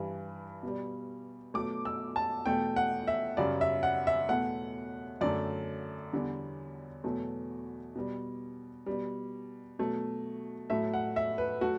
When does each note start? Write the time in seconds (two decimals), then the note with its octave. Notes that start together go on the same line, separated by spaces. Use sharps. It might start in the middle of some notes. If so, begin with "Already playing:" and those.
Already playing: G2 E3 G3
0.63 B2 G3
1.54 B2 F#3 A3 D6
1.85 E6
2.16 A5
2.46 E2 B2 A3 G5
2.76 F#5
3.07 E5
3.37 F#2 C#3 G3 D5
3.61 E5
3.83 F#5
4.07 E5
4.29 E2 B2 A3 F#5
5.21 F#2 D3 A3 D5
6.13 E2 D3 G3
7.04 E2 B2 F#3 A3
7.96 B2 G3
8.86 B2 G3
9.79 B2 F#3 A3
10.70 A2 F#3 A3 E5
10.94 F#5
11.16 E5
11.38 B4
11.61 F#3 A3 F#4